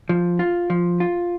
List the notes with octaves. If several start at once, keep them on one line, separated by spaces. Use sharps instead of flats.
F3
F4
F3
F4